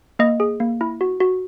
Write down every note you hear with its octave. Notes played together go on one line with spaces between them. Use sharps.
A#3 D#5
G#4
A#3
E4
F#4
F#4